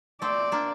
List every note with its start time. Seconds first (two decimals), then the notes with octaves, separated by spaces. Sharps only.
0.22 A3 C4 D5
0.52 A#3 D4